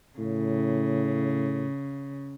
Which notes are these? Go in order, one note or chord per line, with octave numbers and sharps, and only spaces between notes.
A2 C#3